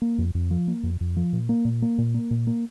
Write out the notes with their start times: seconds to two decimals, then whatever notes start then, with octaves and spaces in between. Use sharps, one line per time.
0.02 A#3
0.18 F2
0.35 F2
0.51 F3
0.68 A#3
0.83 F2
1.01 F2
1.17 F3
1.33 A#2
1.49 A#3
1.65 A#2
1.82 A#3
1.98 A#2
2.14 A#3
2.31 A#2
2.47 A#3